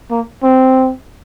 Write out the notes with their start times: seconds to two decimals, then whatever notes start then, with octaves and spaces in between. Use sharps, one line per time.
0.11 A#3
0.43 C4